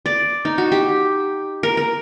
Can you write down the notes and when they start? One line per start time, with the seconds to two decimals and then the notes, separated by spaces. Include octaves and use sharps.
0.06 D5
0.45 D#4
0.58 F#4
0.72 G4
1.63 A#4
1.77 A#4